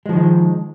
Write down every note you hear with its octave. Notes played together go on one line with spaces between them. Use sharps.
D#3 F3 G#3